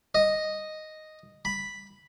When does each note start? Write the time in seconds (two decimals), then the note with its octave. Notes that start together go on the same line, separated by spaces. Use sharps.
0.15 D#5
1.45 B5